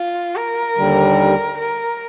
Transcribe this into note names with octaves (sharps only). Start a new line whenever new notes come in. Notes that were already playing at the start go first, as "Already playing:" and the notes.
Already playing: F4
A#4
D#2 D3 G3
A#4